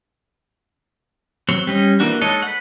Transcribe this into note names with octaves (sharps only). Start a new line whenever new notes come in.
F#3 C4 C#5
G3 C#4 D#5
E3 A#3 D4 F#4
G#3 D#4 A4 C#5 D#5
B4 F#5